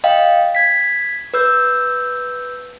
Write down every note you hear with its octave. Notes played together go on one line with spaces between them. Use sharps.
D#5 F5 G5
G#6 B6
B4 E6 G6